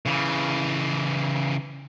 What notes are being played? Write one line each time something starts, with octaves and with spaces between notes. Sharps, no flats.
C#3 E3